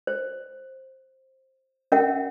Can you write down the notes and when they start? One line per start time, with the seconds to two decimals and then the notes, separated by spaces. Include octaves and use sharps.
0.07 C5
1.92 C#4 A#4 E5 F#5 G5